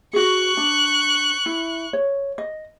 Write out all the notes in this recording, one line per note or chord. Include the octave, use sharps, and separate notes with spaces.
F#4 G#4 C#6 F#6
D4
E4
C#5
D#5